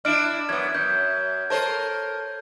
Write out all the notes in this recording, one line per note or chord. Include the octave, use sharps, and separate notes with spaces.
D4 E4 F6 D7 E7
F#2 B3 G#6
F#2 G6
A4 A#4 C5 C#5 A5